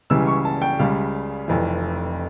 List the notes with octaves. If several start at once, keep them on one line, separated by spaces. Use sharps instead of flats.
C#2 C#3 E3 G3 E6
C#6
A5
G5
C#2 C#3 G3 F5
F1 F2 E3